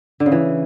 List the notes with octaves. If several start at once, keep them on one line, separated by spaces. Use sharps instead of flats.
D3
C#3
E3